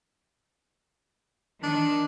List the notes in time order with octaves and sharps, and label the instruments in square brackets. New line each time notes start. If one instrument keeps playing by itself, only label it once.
[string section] D#3 [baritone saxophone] D4